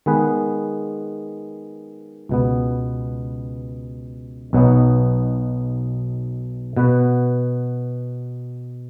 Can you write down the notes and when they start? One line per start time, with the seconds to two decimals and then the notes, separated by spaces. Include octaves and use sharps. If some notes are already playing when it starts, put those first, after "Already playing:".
0.06 D#3 G#3 B3 G#4 B4
2.29 C#2 B2 B3
4.53 B1 B2 F#3 B3 D#4
6.77 B2 B3 F#4 B4